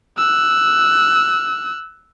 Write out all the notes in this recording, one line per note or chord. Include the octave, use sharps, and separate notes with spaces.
E6 F#6